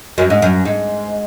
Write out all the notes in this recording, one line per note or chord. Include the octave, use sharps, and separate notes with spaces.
F#2
G#2
F#2
G#2